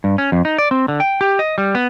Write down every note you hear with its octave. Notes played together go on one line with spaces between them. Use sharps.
G2
C#4
F2
D#4
D5
C4
D3
G5
G4
D#5
G3
B3